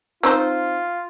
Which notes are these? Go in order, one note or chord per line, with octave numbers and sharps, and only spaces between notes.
C4 D#4 F4 C5